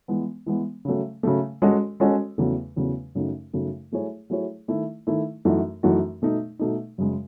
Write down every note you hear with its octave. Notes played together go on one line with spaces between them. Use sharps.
E3 G#3 B3
E3 G#3 B3
C#3 F#3 A3
C#3 F#3 A3
G#3 C#4 F#4 A4 D#5
G#3 C#4 F#4 A4 D#5
E2 C#3 F#3 A3
E2 C#3 F#3 A3
F#2 C#3 F#3 A3 D#4
F#2 C#3 F#3 A3 D#4
F#3 A3 E4 G#4 C#5
F#3 A3 E4 G#4 C#5
D#3 A3 E4
D#3 A3 E4
F#2 E3 A3 D#4 F#4
F#2 E3 A3 D#4 F#4
B2 A3 D#4
B2 A3 D#4
F#2 C#3 G#3